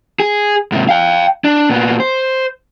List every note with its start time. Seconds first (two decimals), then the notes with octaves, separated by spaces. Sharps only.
0.20 G#4
0.72 G#2 C3
0.89 F5 G5
1.44 D4
1.70 A#2 B3
2.00 C5